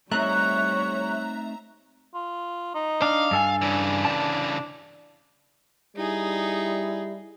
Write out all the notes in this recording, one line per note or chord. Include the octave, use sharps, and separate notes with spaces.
G3 A3 C4 D#4 C#5 E5 A#5 F#6
F4
D#4
D4 F5
G2 A4 G#5
C#3 E3 D4
D4 A5
G3 D#4 E4 G#4